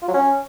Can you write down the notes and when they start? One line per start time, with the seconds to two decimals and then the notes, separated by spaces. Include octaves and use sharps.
0.02 F4
0.08 F#3
0.14 C#4